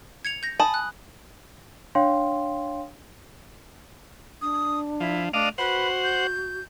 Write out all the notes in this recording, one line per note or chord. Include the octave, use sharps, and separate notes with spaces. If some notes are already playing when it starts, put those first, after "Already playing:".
G#6 C#7 F7
G6 A#6
G#5 A5 B5 D#6
F#6
D4 C#5 F5 G5 C6
D4 D#6
F3 E4
A3 D4 D5 D#5 F5
F#4 B4 C5 F#5
G6